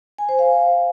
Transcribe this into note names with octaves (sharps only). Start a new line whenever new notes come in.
G#5
C5
F5